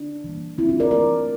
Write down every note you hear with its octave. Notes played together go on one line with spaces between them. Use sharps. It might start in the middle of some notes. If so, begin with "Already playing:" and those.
Already playing: D4
E3 G3 A#3
C4 E4
D4 F4
A#4 D5
E3 A3 A#4 D5